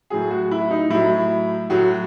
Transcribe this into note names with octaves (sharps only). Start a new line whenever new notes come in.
A2 F#3 G#4
F#4
E4
D#4
A2 F#3 E4
A2 F#3 F#4